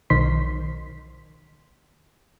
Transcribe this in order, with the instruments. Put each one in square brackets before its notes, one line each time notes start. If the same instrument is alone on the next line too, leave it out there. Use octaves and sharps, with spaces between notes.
[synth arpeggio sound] B1 D#3 C5 C6 B6